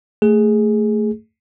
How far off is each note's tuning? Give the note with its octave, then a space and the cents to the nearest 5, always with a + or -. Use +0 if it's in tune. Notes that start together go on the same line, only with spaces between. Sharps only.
A3 +10 G#4 +0